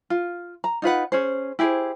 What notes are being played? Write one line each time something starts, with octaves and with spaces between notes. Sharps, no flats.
F4
A#5
D#4 F4 B4 F#5
C#4 G#4 C5
E4 G4 G#4 C5